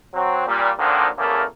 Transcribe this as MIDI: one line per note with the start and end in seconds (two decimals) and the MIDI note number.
0.13 0.46 54
0.13 0.46 60
0.46 0.70 46
0.46 0.70 55
0.78 1.07 46
0.78 1.07 50
0.78 1.07 51
0.78 1.07 53
0.78 1.07 54
0.78 1.07 60
1.17 1.43 40
1.17 1.43 49
1.17 1.43 57
1.17 1.43 58
1.17 1.43 70